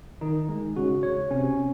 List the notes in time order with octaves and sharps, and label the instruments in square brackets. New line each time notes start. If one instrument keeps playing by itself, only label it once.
[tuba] D#3 [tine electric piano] D#4
[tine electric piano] G#3
[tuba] C#3 [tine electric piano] F#4
[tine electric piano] C#5
[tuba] C3 [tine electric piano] C#4